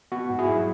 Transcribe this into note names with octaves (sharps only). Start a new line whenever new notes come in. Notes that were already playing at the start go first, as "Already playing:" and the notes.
B3 F#4
G#2
E4 G#4
F#3